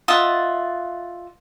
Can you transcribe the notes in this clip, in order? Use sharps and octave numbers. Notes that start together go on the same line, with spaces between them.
F4 D#5 E5 F#5